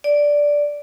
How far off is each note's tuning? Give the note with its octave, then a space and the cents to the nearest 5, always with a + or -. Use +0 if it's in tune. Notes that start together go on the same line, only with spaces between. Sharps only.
D5 -5